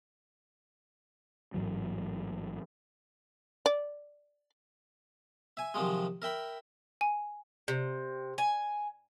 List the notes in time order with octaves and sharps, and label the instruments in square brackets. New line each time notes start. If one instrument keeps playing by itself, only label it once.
[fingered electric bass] A1 G#2 E3 F#3
[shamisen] D5
[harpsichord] E5 G#5
C3 D#3 F3 F#3 G#3
A#4 E5 G5 B5
[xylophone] G#5
[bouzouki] C3
G#5